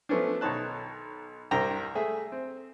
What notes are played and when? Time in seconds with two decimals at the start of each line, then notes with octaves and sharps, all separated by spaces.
0.09 F3 A3 B3 C#4 D4
0.41 B1 D#3 D#4 C#5 A5 F#6
1.51 C2 G2 C3 G5 A#5
1.95 A3 G#4 E5
2.32 C4